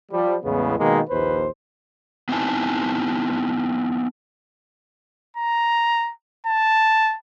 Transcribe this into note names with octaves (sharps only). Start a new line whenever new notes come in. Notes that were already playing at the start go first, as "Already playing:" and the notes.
F3 G3
E2 A2 C#3 G#3 B3
B2 D#3 G#3 A#3
A#1 D#2 B4 C5
B3 C4 D#4 E4 G#5 A5
A#5
A5